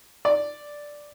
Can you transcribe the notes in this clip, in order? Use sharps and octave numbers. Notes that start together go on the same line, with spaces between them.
D5